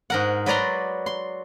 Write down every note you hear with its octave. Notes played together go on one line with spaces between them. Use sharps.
G#2 A#4 F#5
F#3 B4 D5 A#5 C6
C6